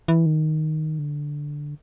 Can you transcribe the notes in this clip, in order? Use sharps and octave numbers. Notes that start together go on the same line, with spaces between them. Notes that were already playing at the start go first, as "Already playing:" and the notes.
E3
D#3
D3